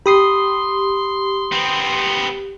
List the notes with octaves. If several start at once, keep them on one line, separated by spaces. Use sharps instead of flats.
G4 B5 C6 D#6 C7
B3 C4